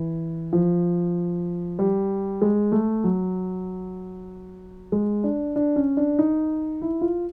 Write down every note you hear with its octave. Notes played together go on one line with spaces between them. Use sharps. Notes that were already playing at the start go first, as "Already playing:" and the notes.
Already playing: E3
F3
G3
G#3
A3
F#3
G#3
D4
D4
C#4
D4
D#4
E4
F4